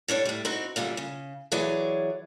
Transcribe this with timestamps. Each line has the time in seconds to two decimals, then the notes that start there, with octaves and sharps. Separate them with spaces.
0.08 A2 G3 D4 C#5
0.25 A2 G3
0.45 C4 D#4 E4 F#4
0.76 F#2 A#2 D3 G3
0.97 C#3
1.52 E3 F#3 G#4 C#5 D5